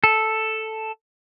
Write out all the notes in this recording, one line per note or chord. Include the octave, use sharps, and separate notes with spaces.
A4